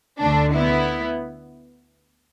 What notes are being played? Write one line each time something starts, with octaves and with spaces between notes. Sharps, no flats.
D2 D3 A3 D4
B3 E4